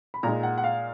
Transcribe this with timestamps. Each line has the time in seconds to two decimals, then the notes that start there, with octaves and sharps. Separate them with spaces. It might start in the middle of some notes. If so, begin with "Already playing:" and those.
0.14 B5
0.23 A#2 G#3 D#4 A#5
0.43 F#5
0.58 F#5
0.64 F5